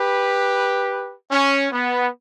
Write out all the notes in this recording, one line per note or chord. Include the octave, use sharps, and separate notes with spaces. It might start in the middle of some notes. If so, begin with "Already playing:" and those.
Already playing: G4 B4
C#4
B3